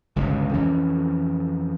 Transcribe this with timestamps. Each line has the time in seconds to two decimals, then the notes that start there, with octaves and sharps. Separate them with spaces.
0.16 G1 C#2 G2 B2
0.54 F2 E3 C#4